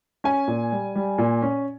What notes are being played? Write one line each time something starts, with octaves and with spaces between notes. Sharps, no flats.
C#4 G#5
A#2
G3
G3
A#2
C#4